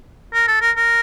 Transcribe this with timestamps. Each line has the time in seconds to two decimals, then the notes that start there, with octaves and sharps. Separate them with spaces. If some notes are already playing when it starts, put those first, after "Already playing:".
0.34 A#4
0.48 A4
0.61 A#4
0.76 A#4